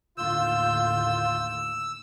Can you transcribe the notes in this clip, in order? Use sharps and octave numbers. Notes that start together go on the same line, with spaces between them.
D#2 A2 D3 F4 E6 G6